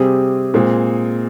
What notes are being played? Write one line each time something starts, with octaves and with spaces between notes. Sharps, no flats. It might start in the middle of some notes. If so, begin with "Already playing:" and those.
Already playing: C3 G3 C4 G#4
A#2 G#3 C4